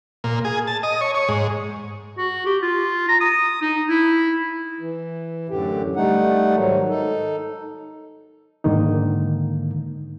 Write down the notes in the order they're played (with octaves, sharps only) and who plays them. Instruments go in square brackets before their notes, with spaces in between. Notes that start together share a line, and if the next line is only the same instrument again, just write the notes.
[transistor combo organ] A#2
G#4
A5
D#5
C#5
C#5
G#2
[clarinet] F#4
G4
F4
A#5
D#6
D#4
E4
[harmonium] E3
F#2 A2 D3 G4
G3 A3 D#4 F#5
G#2 D#3 F#3
D#4 A4
[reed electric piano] G#2 D3 D#3 A#3 D#4